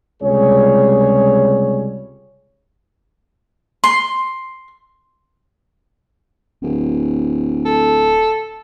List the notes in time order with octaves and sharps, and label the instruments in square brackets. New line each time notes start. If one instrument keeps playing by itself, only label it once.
[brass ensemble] C#2 C3 G3 G#4 C#5
[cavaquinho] C6
[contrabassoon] D1
[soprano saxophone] A4